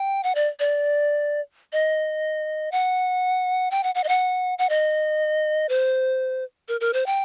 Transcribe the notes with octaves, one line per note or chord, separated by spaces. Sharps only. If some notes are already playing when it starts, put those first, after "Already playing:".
Already playing: G5
F#5
D5
D5
D#5
F#5
G5
F#5
F#5
D#5
F#5
F#5
D#5
C5
A#4
A#4
C5
G5